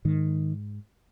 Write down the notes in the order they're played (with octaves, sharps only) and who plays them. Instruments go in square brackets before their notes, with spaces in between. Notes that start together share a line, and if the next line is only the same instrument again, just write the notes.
[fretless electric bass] G#2 D#3